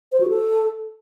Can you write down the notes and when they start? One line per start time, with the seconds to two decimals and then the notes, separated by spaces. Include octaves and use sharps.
0.12 C5
0.21 F#4
0.29 A4